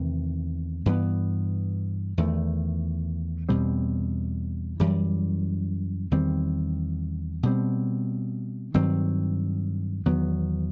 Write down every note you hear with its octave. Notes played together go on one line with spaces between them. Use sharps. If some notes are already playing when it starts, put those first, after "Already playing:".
Already playing: E2 C3 D#3 A3
G2 E3 B3
E2 D#3 A3
E2 B2 G3 C4
F#2 E3 G3
E2 D#3 G3 C4
B2 G3 C4
G2 D#3 F#3 C4
E2 D#3 F#3 B3